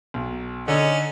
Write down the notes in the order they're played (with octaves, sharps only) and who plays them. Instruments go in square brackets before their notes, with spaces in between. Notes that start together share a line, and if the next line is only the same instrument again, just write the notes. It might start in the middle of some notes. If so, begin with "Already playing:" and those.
[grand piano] B1
[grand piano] D3 [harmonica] C#4 D#4